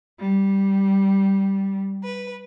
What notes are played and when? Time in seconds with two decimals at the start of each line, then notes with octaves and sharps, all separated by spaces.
0.19 G3
2.03 B4